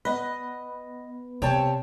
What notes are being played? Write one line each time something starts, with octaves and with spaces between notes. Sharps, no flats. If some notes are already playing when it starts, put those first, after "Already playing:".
B3 B4 D#5
C3 C#5 G5 A5